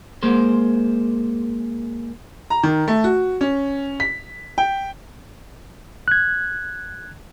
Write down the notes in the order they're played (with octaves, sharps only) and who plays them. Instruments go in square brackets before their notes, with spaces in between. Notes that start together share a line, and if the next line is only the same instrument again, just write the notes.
[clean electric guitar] G#3 A#3 C5
[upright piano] A#5
D#3
A3
F#4
C#4
B6
G5
[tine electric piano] F#6 G#6